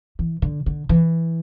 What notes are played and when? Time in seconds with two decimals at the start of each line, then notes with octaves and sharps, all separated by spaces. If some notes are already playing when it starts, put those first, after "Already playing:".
0.19 E3
0.42 D3
0.66 D3
0.89 E3